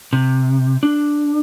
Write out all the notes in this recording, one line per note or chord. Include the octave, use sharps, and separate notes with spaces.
C3
D4